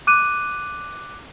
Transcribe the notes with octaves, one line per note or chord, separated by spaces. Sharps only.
D6 F#6 D#7